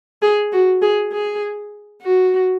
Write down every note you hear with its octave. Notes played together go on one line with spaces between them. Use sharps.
G#4
F#4
G#4
G#4
F#4